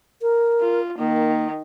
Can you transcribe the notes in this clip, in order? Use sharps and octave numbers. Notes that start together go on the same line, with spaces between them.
A#4
F4
D#3 A#3